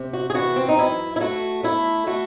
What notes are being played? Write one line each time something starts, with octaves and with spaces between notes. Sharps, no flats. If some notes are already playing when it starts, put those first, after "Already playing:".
Already playing: C3
F#4
G#4
E3 F#4
C4
D#4
F#2 E4
E4
A3 F#4
A3 E4
A3 F#4